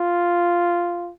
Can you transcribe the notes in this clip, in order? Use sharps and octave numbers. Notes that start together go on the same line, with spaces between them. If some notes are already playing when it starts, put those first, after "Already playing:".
Already playing: F4